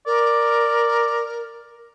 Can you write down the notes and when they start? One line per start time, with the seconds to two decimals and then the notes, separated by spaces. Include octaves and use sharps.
0.06 A#4 D5